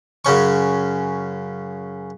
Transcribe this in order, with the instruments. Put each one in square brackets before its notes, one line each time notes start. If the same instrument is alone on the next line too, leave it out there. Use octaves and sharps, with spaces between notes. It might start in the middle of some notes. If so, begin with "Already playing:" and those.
[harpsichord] F#2 C#3 C#4 C#6